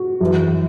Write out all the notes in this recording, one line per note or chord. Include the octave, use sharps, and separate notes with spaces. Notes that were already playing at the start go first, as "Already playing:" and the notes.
Already playing: F#4
F#2 E3